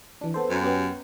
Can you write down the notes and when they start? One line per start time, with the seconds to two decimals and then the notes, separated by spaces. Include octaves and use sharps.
0.21 E3 D4
0.34 B3 A4 C5
0.50 F#2
0.63 B3 C#4 G4